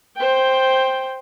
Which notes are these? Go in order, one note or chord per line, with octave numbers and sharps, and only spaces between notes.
C5 G5